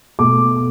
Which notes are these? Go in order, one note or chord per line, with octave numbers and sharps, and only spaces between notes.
B2 A3 D6